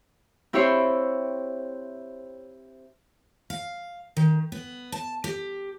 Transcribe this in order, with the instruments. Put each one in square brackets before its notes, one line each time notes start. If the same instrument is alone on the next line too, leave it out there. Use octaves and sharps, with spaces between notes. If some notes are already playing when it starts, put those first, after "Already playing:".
[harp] C4 E4 G4 C#5 E5 C6
[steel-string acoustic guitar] F5
D#3
B3
A5
G4